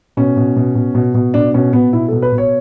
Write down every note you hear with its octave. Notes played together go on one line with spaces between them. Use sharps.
B2 C#4
B2
B2
B2
B2
B2
B2 D4
B2 C#4
B2 B3
B2 E4
B2 A4
B4
B2
C#5